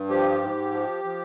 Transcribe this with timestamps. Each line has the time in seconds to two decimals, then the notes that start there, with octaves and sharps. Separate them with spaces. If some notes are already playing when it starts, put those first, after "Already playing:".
Already playing: G2
0.09 F3 G4
0.42 G#2
0.72 F3
1.04 F3